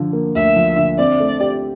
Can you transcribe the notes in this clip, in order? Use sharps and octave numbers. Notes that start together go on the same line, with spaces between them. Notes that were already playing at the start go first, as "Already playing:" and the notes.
Already playing: D3 F3
A#3
D2 E5
F3
D3
C4 D5
A3
G4